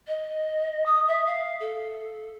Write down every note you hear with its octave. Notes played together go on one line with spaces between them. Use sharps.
D#5
D#6
E5
F5
A4